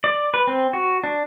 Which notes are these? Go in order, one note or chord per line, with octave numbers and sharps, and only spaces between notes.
D5
B4
C4
F#4
D4